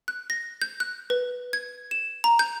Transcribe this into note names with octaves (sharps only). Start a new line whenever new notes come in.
F#6
A#6
G6
F#6
B4
G#6
E7
A#5
G6